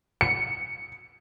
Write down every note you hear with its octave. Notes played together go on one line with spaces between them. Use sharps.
C#7